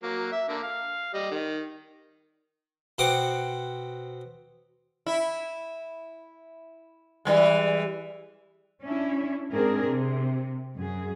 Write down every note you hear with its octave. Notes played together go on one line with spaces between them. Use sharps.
F#3 A#3
E5
D3 A#3
F5
G3 D#5
D#3
B2 C4 F#5 D6
E4
E3 G3 G#3
C#4 D4 E4
G#2 C4 D4 G#4 A#4
C3
F#2 G#4